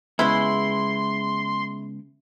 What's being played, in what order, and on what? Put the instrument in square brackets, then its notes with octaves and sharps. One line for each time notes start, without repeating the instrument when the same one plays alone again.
[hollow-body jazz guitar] C#3 G#3 B3 [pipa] E4 [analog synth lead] C6